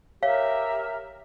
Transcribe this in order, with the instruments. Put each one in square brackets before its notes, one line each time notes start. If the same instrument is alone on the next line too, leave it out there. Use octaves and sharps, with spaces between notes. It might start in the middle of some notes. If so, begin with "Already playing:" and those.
[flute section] G4 A#4 E5 A#5 [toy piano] C#5 F5